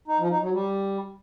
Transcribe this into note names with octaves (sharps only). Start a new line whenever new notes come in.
D#4
F3
D#4
F#3
G3